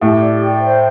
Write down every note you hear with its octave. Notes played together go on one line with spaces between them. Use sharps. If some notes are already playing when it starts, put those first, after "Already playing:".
A2 G4
D5
G5
C5